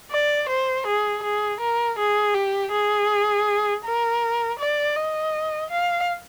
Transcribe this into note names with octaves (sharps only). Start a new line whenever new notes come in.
D5
C5
G#4
G#4
A#4
G#4
G4
G#4
A#4
D5
D#5
F5